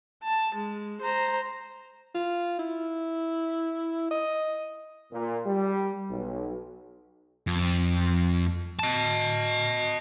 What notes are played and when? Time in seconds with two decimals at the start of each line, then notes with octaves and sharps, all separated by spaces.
0.23 A5
0.55 G#3
1.01 C5 A#5
2.15 F4
2.59 E4
4.11 D#5
5.13 A#2
5.46 G3
6.11 B1
7.47 F2
8.79 D#5 A5